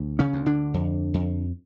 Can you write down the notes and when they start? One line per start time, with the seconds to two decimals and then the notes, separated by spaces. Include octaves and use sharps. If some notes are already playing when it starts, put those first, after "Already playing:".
Already playing: D2
0.19 C#3 C#4
0.33 D2
0.46 D3 D4
0.74 F2
1.14 F2